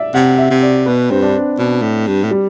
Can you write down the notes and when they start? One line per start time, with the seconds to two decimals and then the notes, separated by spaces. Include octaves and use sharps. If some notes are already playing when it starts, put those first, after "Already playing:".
Already playing: D5 E5
0.14 C3 F#5
0.38 E5
0.50 C3
0.63 D5
0.86 B2 B4
1.10 G2 C4
1.22 D4
1.58 B2 D4
1.82 A2
2.07 G2
2.23 A2
2.31 G3